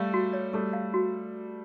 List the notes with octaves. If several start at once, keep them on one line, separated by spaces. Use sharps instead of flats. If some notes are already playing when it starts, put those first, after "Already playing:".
Already playing: G3 A3 F5
F#4
C#5
G3 A3 A4
F5
F#4